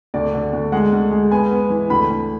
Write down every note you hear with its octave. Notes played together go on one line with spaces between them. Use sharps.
D2 D5
D3
D2
G#3 F#5
D2
G#3
B3 G#5
B3
E3
D2 B5
D2